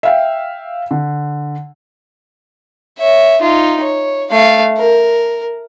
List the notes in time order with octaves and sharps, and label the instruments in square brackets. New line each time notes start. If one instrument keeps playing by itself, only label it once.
[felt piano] E5 F5 G5
D3
[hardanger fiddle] C#5 E5
D#4 F4
C#5
A3 F5
A#4